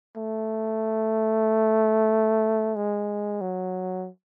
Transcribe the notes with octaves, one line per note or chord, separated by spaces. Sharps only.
A3
G#3
F#3